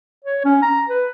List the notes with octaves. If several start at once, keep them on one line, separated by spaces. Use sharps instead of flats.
C#5
C#4
A#5
B4